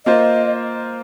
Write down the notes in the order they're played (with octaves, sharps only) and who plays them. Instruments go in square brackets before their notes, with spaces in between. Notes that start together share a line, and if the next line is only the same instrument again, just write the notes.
[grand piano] A#3 F4 C5 [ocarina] D#5